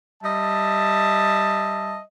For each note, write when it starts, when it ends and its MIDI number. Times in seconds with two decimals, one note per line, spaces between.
0.23 1.99 55
0.23 1.99 75
0.23 1.99 76
0.23 1.99 81